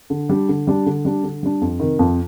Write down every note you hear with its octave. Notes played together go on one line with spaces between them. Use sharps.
D3
G3 D4
D3
G3 D4
D3
G3 D4
D3
G3 D4
F2
C3 D#3
F2